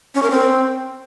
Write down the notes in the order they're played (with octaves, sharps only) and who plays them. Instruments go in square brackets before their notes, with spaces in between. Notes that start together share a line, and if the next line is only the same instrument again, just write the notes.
[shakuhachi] C#4
A#4
C4